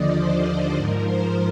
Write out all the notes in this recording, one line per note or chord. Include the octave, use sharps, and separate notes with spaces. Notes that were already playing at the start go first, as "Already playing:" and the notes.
Already playing: D#2 D3 F3 D5 D#5
C5
C5
G#2 F3 A#4
C5